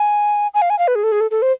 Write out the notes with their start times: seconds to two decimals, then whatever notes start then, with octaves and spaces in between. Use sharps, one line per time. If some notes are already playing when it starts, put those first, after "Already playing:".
Already playing: G#5
0.54 G#5
0.62 F5
0.70 G#5
0.79 F5
0.88 B4
0.95 G#4
1.03 A4
1.12 G#4
1.20 A4
1.31 A4
1.42 C5